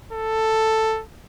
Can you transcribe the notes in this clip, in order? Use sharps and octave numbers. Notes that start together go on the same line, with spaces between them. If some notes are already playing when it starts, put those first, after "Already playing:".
A4